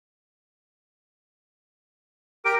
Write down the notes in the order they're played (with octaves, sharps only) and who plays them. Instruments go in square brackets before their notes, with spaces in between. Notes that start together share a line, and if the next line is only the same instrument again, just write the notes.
[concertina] G4 A#4 [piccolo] D7